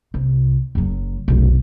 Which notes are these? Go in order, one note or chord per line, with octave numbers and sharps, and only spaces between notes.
C2 C3
F#1 F#3
F1 B1